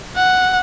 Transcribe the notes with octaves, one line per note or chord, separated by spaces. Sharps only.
F#5